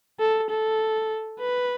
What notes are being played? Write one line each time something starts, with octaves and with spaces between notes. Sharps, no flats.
A4
A4
B4